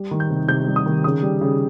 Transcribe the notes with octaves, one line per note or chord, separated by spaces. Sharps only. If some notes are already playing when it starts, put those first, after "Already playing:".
Already playing: G3
D#3
G6
C3
C3 G6
G3
D#6
D#3
C#3 D#6
G3
C#3